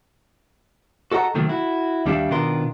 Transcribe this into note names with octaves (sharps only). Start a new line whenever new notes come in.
F#4 A4 D#5 F#5 A#5
C3 D#3 F#3 A3 A#3
E4 F#4
D#2 G3 D4 G4 E5 F5
B2 D#3 D4 F4 A#4 C6